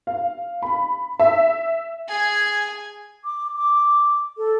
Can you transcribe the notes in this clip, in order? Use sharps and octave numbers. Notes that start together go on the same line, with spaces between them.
F5
B5
E5
G#4 G#5
D6
D6
A4